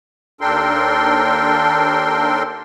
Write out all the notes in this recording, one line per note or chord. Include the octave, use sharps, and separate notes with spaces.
D#2 D4 A4 A#4 G5 C6